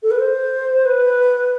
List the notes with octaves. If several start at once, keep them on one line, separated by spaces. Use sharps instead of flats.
A4
B4
C5
B4